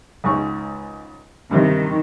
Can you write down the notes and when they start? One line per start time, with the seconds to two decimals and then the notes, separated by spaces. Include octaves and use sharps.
0.24 C#2 G#2 C#6
1.51 G2 C3 D#3 C5